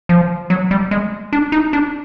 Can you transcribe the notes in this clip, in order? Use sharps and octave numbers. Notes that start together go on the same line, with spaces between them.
F3
F#3
G3
G#3
D4
D#4
D4